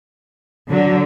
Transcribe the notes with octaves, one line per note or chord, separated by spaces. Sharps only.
D3 F#3